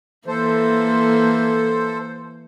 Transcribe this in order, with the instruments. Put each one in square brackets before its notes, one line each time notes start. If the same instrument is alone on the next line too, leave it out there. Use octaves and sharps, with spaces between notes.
[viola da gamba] E3 A#3 [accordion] A4 C5